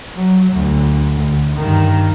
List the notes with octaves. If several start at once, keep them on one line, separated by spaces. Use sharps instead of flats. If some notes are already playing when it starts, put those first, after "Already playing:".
F#3
D2
D2
G2 D#3